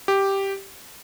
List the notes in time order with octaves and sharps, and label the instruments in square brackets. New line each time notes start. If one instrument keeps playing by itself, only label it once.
[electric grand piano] G4